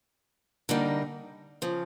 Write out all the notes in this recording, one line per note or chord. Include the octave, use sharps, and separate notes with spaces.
D3 G3 A#3 D#4
C#3 F3